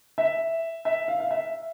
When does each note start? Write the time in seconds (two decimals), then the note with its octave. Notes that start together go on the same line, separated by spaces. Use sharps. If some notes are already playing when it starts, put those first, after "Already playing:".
0.18 E5
0.85 E5
1.08 F5
1.20 F5
1.31 E5